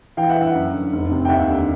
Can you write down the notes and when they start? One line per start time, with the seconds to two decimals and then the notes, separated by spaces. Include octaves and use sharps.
0.17 E3 F5 G5
0.29 E5 F#5
0.36 E3
0.42 E5 F#5
0.55 F#2
0.73 D3
0.93 F1
1.11 C3
1.25 G5
1.29 D#2 E5 F#5
1.48 D3